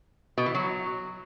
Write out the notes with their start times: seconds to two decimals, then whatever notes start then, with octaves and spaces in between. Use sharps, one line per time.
0.38 B2
0.46 E3
0.55 F#3